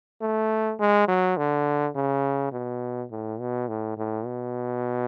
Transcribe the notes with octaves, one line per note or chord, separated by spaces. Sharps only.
A3
G#3
F#3
D3
C#3
B2
A2
B2
A2
A2
B2